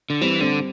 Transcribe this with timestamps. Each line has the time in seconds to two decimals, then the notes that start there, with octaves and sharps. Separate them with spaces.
0.10 D3
0.21 E3 G3 C4
0.41 D3 G3 C4